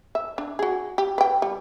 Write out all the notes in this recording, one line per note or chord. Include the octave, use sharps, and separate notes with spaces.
E5
D4
F#4 G#4
G4
B4 G5
G3